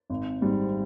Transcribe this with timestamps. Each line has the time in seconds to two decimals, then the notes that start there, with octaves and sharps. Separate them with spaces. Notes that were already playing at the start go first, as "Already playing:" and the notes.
0.10 G#1
0.41 G#2 G3 C4